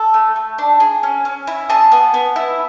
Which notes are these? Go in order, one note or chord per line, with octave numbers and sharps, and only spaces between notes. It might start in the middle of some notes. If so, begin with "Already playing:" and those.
Already playing: A4
A3
A3
D4
G#4
C#4
C#4
E4
G#4 A5
B3
B3
E4